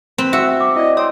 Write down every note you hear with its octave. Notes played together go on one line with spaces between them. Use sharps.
C4 B4
F#4 E5
D6
E4 D5 D#5
C4 C#5 D#6